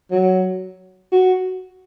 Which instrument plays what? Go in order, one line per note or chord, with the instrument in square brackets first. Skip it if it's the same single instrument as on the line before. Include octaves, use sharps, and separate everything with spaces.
[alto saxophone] F#3
F#4